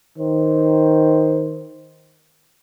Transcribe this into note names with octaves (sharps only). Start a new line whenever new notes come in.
D#3 C5